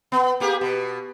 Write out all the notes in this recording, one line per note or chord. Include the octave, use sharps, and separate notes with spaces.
B3
A#3 G4 G#4
B2